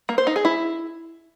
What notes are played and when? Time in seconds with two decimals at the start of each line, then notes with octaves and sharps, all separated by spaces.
0.09 A#3
0.18 C5
0.27 D#4
0.36 G#4
0.45 E4